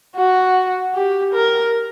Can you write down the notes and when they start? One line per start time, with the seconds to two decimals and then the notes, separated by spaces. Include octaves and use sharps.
0.17 F#4
0.95 G4
1.33 A#4